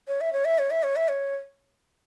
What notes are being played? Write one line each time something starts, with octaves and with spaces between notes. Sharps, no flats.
C#5
E5
C#5
E5
C#5
E5
C#5
E5
C#5